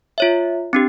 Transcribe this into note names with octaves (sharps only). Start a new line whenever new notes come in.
F4 C#5 E5
C4 D4 G4